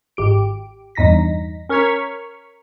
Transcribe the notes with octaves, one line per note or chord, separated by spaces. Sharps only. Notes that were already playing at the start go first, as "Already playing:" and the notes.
G#1 G4 D7
E2 G2 D#4 A#6 B6
C#4 A#4 C#6 F6 G#6 B6